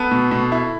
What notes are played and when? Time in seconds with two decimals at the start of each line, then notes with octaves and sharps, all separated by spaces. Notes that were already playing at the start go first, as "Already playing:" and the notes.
Already playing: B3 A4
0.11 B2
0.31 B2
0.52 E4